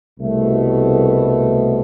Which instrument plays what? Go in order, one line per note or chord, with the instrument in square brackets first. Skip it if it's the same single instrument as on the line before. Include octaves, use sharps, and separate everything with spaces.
[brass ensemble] C2 B2 A3